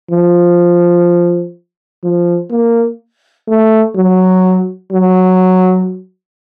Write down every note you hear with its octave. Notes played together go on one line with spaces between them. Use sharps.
F3
F3
A#3
A3
F#3
F#3